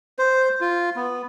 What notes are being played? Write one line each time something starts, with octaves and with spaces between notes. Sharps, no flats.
C5
F4
B3